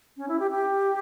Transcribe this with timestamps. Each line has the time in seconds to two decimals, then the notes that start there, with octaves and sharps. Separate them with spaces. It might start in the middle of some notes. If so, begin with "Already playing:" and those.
0.17 C#4
0.28 E4
0.40 G4
0.51 G4